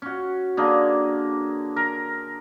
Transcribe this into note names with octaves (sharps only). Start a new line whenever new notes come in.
C#4 F#4
D3 A#3 G#4
A#4